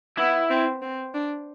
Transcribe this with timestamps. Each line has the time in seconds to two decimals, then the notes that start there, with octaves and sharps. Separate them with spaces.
0.18 B3 E4
0.49 C4
0.82 C4
1.14 D4